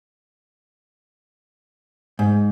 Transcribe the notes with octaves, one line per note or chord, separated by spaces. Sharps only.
G#2